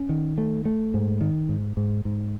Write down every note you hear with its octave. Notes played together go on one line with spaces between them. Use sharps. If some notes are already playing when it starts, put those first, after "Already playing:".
Already playing: C#4
D#3
A3
A3
G#2
D#3
G#2
G#2
G#2